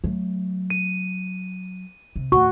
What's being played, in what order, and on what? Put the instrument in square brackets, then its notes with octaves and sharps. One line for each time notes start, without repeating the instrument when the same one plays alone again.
[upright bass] F#3 A3
[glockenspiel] D#7
[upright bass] C3
[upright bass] D#2 A2 [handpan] F#4 [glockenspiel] C#6